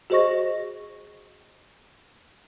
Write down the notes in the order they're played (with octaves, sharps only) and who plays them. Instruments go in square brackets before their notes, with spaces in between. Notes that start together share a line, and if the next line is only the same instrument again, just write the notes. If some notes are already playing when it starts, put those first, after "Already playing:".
[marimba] F#4 G#4 C5 D#5 C#6 A#6